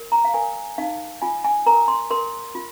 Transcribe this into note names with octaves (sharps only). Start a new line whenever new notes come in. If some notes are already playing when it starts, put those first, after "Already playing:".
Already playing: A#4
A#5
F5
A#4 G#5
D#4 F5
F4 G#5
G#5
A#4 A#5
C6
A#4 C6
F4